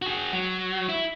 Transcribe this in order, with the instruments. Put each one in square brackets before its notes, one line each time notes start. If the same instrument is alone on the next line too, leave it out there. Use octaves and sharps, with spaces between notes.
[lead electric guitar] F#4 G#4
F#3
E4